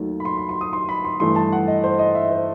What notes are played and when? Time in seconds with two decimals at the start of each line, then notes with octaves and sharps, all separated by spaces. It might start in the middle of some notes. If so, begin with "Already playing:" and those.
Already playing: D#2 D#3 F#3 A3
0.20 B5
0.25 C6
0.37 B5
0.49 C6
0.61 D#6
0.73 C6
0.89 B5
1.04 C6
1.20 G2 E3 A3 C6
1.36 A5
1.53 F#5
1.68 D#5
1.84 C5
1.99 D#5
2.15 E5
2.31 C5